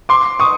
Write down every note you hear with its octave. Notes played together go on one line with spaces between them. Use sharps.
C6 D6
C#6 D#6